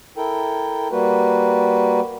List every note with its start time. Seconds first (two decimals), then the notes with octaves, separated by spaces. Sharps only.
0.17 E4 A4 A#4 G5
0.92 G3 A#3 F#4 B4